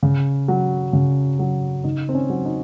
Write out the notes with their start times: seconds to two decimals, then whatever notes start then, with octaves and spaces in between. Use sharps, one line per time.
0.03 C#3
0.48 F#3
0.93 C#3
1.39 F#3
1.84 C#3 D#4
2.09 C4
2.15 C#4
2.30 F#3
2.45 D#4